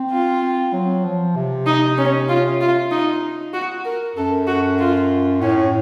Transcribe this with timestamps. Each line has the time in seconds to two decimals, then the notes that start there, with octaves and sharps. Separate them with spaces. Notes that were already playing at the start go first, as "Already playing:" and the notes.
Already playing: C4
0.11 F4
0.42 C4
0.73 F#3
1.05 F3
1.36 C3
1.66 D#4
1.98 C#4
2.29 F4
2.61 F4
2.91 D#4
3.53 F#4
3.85 A#4
4.16 F#2 A4
4.47 F#4
4.79 F4
5.41 A2 C#4